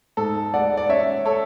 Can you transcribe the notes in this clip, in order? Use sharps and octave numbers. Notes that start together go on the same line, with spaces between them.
G#2 A4
G#3 D5 F#5
D5
C#4 C#5 E5
A4 C#5